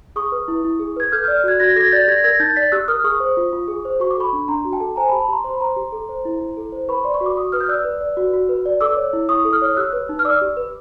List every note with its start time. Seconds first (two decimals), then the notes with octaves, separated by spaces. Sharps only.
0.16 G#4 C#6 D#6
0.32 B4
0.48 E4
0.64 E4
0.80 G#4
0.96 B4 G#6
1.12 A4 F6 G6
1.24 D5 F6 G6
1.44 F#4 F#6 G#6
1.60 F#4 G#6 A#6
1.76 A4 G#6 A#6
1.92 D5 G6 A6
2.08 G4 G#6 A#6
2.24 A#4 G#6 A#6
2.40 D#4 G6 A6
2.56 D5 A6 B6
2.72 G4 E6 F#6
2.88 A#4 D#6 F6
3.04 G#4 C#6 D#6
3.20 C5
3.37 F4
3.53 F4
3.68 G#4
3.85 C5
4.00 F#4 C#6
4.11 D6
4.17 A4 B5 C#6
4.33 D4
4.48 D4 A#5 C6
4.65 F#4
4.73 G5 A5
4.80 A4
4.96 C5 G#5 A#5
5.09 A5 B5
5.12 G4
5.20 A5 B5
5.28 G4 A#5 C6
5.44 C5 C6
5.53 B5
5.61 C5 A#5 C6
5.76 G4
5.92 A4
6.09 C5
6.25 E4
6.41 E4
6.57 A4
6.72 C5
6.88 B4 B5 C#6
7.03 D5 C6
7.14 C#6
7.21 F#4
7.26 D6
7.36 F#4 C#6 D#6
7.52 B4 D#6 F6
7.61 G6
7.68 D5 E6 F#6
7.84 B4
8.01 D5
8.17 F#4
8.33 F#4
8.49 B4
8.66 D5
8.81 A4 D6 E6
8.97 C#5
9.13 E4
9.29 E4 C#6 D#6
9.45 A4
9.53 D#6 F6
9.62 C#5
9.77 G4 E6 F#6
9.93 B4
10.09 D#4
10.19 F6
10.25 D5 D6 E6
10.41 G4
10.57 B4